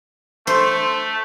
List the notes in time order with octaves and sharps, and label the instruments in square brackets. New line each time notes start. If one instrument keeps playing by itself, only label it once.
[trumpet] A3 [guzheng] C5